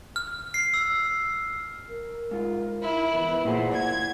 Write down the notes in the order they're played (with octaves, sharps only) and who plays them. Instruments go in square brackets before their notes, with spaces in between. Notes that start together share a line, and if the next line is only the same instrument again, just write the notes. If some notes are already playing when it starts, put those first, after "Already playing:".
[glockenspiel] F6
C7
E6
[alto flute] A#4
[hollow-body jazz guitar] G#2 F4
[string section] E4
[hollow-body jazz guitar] E2 [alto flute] B4
[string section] A#2 [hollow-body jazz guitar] E4 G#4 C5 [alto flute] F#5
[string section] G#6